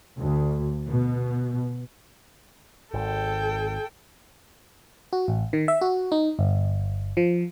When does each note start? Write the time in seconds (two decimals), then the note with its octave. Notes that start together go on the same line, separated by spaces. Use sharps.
0.18 D2
0.91 B2
2.94 G#1 A4 G5
5.13 F#4
5.28 A1
5.53 D#3
5.68 E5
5.81 F#4
6.12 D#4
6.39 G1
7.17 F3